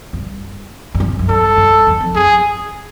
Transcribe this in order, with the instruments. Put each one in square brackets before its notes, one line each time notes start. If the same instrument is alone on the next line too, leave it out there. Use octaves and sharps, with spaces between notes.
[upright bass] G2
G2
F#2
F2
F#2
[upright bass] G2 [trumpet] A4
[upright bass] G2
E2
F2
[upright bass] F#2 [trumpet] G#4